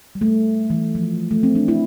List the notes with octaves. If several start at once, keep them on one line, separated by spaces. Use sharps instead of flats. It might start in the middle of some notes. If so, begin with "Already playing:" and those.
G3
A3
E3
F3
A3
C4
D4
E4